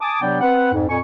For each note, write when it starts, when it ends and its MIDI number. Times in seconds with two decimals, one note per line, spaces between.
0.01 0.18 80
0.01 0.18 81
0.01 0.18 86
0.01 0.18 87
0.22 0.37 48
0.22 0.37 54
0.22 0.37 59
0.22 0.37 62
0.22 0.37 74
0.22 0.37 79
0.41 0.72 60
0.41 0.72 71
0.41 0.72 78
0.73 0.84 41
0.73 0.84 44
0.88 0.98 41
0.88 0.98 46
0.88 0.98 80
0.88 0.98 85